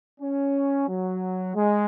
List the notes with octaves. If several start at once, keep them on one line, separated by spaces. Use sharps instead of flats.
C#4
F#3
G#3